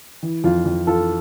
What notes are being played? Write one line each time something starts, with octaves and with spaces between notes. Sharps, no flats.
E3
F2 F4
F2
E3 F4 A4